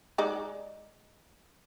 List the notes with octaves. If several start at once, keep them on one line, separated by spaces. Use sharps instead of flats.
G#3 D#4 D5